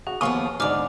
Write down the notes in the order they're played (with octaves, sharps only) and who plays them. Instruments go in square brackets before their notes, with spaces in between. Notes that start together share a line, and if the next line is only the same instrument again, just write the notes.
[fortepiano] F#4 [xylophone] G#4
[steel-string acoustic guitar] D#2 F3 B3 [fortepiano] F5 C#6 D#6 [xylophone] G#5 C6
[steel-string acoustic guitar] G#2 D3 [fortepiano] D#4 D5 [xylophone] A#5 D6 F6